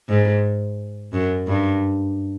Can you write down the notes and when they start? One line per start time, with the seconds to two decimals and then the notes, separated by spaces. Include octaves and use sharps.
0.08 G#2
1.13 F#2
1.47 G2